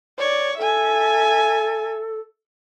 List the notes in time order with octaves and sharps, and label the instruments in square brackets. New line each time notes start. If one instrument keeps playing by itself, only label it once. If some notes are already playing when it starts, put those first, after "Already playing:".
[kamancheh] C#5 D5
[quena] A4 [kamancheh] E5 G#5